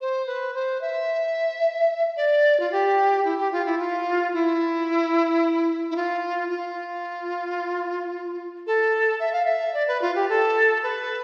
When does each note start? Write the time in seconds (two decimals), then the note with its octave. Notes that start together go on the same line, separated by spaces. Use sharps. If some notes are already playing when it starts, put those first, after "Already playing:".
0.01 C5
0.27 B4
0.54 C5
0.81 E5
2.17 D5
2.60 F4
2.72 G4
3.25 E4
3.38 G4
3.52 F4
3.66 E4
3.79 F4
4.34 E4
5.91 E4
5.96 F4
6.50 F4
8.67 A4
9.20 E5
9.33 F5
9.45 E5
9.74 D5
9.88 B4
10.02 F4
10.15 G4
10.29 A4
10.83 B4